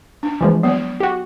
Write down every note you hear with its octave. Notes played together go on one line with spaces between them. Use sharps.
D4
E3 F3 G#3
F#3 B3
F#4 G4